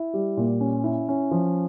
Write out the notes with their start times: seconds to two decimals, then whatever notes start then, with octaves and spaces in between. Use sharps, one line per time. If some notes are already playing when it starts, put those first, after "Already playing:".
Already playing: E4
0.14 G3
0.37 A#2
0.60 C#4
0.84 E4
1.08 C#4
1.31 F3